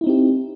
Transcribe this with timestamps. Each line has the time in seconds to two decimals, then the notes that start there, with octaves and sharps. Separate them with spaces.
0.01 E4
0.04 D#4
0.07 C4
0.09 G4